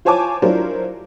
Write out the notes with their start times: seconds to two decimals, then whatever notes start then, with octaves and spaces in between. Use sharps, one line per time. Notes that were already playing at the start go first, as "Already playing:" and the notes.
0.05 F4 C5 C#5 G#5 A5 D6
0.42 F#3 D4 E4 F4 A#4 C5